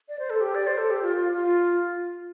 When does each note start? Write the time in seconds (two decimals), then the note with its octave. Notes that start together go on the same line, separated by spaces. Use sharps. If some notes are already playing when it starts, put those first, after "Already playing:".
0.09 D5
0.19 C5
0.30 A4
0.41 G4
0.55 D5
0.67 C5
0.78 A4
0.90 G4
1.02 F4
1.17 F4
1.33 F4